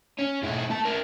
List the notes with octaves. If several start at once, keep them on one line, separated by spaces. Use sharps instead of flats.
C#4
G#2 E4
A3 A5
E4 A#4